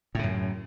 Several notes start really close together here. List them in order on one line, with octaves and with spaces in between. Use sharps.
A2 C#3 F#2